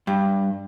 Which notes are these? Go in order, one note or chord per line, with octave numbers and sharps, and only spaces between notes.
G2